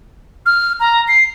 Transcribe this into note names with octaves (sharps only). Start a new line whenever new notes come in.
F6
A#5
C7